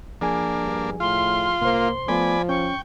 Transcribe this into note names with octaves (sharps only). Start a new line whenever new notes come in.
F3 A#3 D4 G#4 G#5
G2
A2 F4 C6
C2 A#3 C5
F3 A3 B3 D5 G#5 B5
C#4 G5 C#6